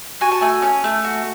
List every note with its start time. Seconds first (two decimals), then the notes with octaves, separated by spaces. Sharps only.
0.21 F#4 G#5
0.32 A5
0.41 A3 G#5
0.62 C#4
0.84 A3
1.04 F#4